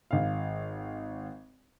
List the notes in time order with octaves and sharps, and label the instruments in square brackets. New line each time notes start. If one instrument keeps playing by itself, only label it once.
[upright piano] G#1 F5